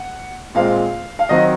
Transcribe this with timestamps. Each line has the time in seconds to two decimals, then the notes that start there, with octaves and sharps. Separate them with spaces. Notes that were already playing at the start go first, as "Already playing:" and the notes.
Already playing: F#5
0.55 A#2 G#3 C4 F5
1.19 F5
1.29 D#3 F#3 C4 D#5